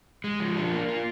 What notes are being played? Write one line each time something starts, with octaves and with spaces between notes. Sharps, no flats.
G#3
F3
D4
A#3
F4